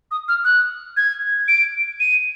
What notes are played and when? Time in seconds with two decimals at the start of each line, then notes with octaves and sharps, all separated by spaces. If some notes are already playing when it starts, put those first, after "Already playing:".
0.11 D#6
0.28 F6
0.45 F#6
0.97 G#6
1.48 D7
2.00 D#7